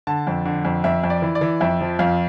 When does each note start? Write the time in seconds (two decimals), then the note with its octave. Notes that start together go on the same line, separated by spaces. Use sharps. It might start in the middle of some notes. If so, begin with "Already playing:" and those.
0.07 D3 A5
0.27 F2
0.45 D3
0.65 F2
0.84 F2 E5
1.04 F2
1.10 D5
1.22 E3
1.35 D5
1.41 E3
1.60 F2 E5
1.81 F3
1.99 F2 F5